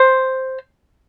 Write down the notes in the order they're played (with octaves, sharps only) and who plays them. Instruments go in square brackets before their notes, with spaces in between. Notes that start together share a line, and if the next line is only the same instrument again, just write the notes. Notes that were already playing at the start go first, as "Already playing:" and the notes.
Already playing: [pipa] C5